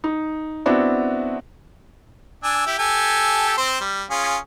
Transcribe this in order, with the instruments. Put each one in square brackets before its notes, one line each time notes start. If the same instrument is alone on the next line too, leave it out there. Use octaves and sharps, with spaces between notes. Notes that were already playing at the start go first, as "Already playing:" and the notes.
[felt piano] D#4
B3 C4 D4 E4 F#4
[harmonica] D4 G#5 E6
E4 G4
G4 A4 G#5
C4 C5
G3
C#4 F4 G#4